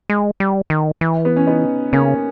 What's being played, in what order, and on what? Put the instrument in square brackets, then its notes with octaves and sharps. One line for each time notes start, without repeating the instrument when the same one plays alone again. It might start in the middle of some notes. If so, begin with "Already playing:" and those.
[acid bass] G#3
G3
D#3
E3
[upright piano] B3
C#4
B3 D#4
[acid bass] C#3 [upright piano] A#3 C#4